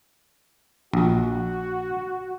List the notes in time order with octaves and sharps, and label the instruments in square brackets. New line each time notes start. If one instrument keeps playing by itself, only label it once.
[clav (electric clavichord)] A#1 [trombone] F#4